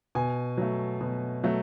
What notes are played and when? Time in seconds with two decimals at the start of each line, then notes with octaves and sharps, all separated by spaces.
0.15 B2 G#5
0.57 F#3 A3
1.01 B2
1.44 F#3 A3